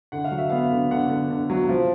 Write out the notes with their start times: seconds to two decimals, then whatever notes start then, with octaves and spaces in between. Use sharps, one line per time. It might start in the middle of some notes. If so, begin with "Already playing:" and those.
0.12 D3 F#5
0.24 F5
0.31 F#3
0.38 E5
0.49 B3 F5
0.71 D3
0.91 D3 F#5
1.10 D3
1.31 D3
1.50 F#3
1.69 F3